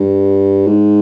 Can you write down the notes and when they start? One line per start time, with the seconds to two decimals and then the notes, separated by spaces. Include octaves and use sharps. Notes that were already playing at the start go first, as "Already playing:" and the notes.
Already playing: G2
0.67 G#2